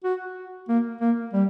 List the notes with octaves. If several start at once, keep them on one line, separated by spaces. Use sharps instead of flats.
F#4
A#3
A#3
G3